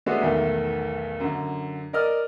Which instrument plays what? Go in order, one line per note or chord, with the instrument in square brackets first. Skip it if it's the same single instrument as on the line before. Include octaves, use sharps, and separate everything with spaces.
[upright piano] G#3 A3 B3 D4 F#4
B1 E2 D#3 A3
F#2 D3
A#4 D5 D#5 F6